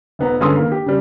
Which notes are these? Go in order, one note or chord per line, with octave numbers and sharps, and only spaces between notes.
F1 B3 A#5
G1 G#3 C#4 A4 C6 D#6
D#3 A#3
G4
C#3 G3